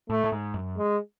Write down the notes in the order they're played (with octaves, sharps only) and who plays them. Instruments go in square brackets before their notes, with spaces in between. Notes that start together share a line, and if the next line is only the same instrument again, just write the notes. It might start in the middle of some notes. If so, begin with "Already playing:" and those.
[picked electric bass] A2 [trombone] A3
[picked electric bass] A2
G#2
F#2
[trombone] G#3